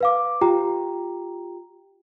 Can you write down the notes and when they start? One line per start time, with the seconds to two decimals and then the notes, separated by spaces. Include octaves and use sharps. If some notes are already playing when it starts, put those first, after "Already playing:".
0.01 B4 F5 D6
0.41 F4 G4 G5 A#5